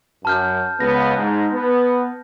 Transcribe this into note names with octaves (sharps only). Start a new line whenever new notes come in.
F#2 A5 F6 G6
C#2 B3 A#6
G#2
B3